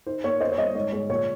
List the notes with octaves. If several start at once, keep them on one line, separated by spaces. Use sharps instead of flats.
D#4 C5
A#3 C#5
C#4 C5 D#5
C#5
G3 C5 D#5
G#2 C#5
G#3 C#5
A#2 C#5